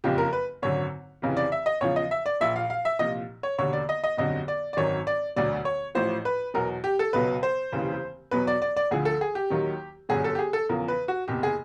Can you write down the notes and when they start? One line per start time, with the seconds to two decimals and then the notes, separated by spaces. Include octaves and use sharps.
0.04 F#1 F2 C#3 F3 G4
0.18 A#4
0.33 B4
0.62 G#1 F#2 D3 F#3 C#5
1.22 F1 F2 C#3 E3
1.37 D5
1.52 E5
1.66 D#5
1.81 E2 C#3 F3 C#5
1.96 D#5
2.11 E5
2.26 D5
2.40 A#1 A#2 F3 E5
2.56 F5
2.70 F5
2.85 E5
2.99 C2 A#2 F3 D#5
3.43 C#5
3.58 E1 D#2 D3 C#5
3.73 D5
3.89 D#5
4.04 D#5
4.17 G1 F2 D3 F#3 D#5
4.48 D5
4.73 D5
4.77 G#1 F#2 D#3 F#3 C#5
5.07 D5
5.36 E1 D2 D3 F#3 D5
5.65 C#5
5.95 A1 A2 F3 C5
6.25 B4
6.54 E2 B2 F#3 A#4
6.84 G4
6.99 A4
7.13 C#2 B2 F#3 B4
7.43 C5
7.72 F1 D#2 C#3 E3
8.31 E2 B2 F#3 B4
8.47 D5
8.62 D5
8.76 D5
8.91 D2 D3 F3 G#4
9.05 A4
9.21 G#4
9.35 G4
9.50 D#2 D#3 F#3
10.09 G1 F#2 D3 F#3 G#4
10.24 A4
10.35 G4
10.39 G#4
10.53 A4
10.69 E2 C#3 F3 A#4
10.88 B4
11.08 F#4
11.28 F#1 E2 C3 G4
11.43 G#4